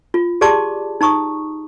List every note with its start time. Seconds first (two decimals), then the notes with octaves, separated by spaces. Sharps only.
0.14 F4
0.41 G4 G#4 D5 A5 C6 D6
1.01 D#4 A#5 C#6 D#6